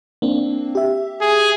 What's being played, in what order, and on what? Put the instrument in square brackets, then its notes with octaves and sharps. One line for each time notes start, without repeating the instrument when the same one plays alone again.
[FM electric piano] A#3 C4 D4
G4 E5
[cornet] G#4